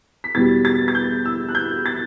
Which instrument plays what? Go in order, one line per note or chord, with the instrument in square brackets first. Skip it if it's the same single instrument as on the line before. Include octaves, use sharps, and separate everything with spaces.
[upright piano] B6
E2 B2 G3 A6
A6
A6
G6
E6
F#6
G6
A6